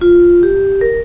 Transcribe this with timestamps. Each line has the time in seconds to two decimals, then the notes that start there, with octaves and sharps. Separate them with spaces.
0.01 F4
0.43 G4
0.81 A#4